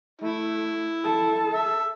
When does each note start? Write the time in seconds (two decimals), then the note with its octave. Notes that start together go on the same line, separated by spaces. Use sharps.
0.21 A3 E4
1.04 A4 A5
1.53 E5